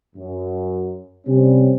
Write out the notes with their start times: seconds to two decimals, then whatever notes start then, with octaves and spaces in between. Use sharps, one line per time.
0.16 F#2
1.27 C3 G3 C4 C#4